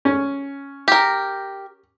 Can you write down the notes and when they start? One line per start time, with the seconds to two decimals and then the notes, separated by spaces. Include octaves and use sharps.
0.05 C#4
0.88 G4 A#4